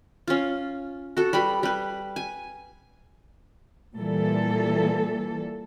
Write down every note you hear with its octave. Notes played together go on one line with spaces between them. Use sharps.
C#4 F4
F#4 A4
G3 B4 B5
G3 B4
G#5
A#2 E3 G3 A4